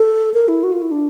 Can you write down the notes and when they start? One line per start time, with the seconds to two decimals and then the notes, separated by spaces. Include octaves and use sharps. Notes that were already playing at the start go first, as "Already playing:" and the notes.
Already playing: A4
0.34 A#4
0.48 E4
0.63 F#4
0.72 F4
0.82 E4
0.91 D4